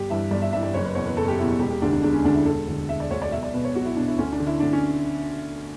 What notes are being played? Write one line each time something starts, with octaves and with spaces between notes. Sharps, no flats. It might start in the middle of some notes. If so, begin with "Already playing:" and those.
Already playing: G1 G4
G2 E3 E5
G1 D5
E5
G2 E3 E5
D5
F#1 C#5
B4
E2 B2 C#5
B4
F#1 A4
G4
E2 B2 E4
E1 G4
G4
D2 D3 D4
D4
E1 D4
C#4
D2 D3 D4
E4
E1 A4
D2 D3
E1 E5
D5
D2 D3 C#5
D5
B1 E5
D5
B2 B4
C#5
B1 F#4
E4
B2 D4
E4
D2 C#4
D4
D3
E4
D2 D4
C#4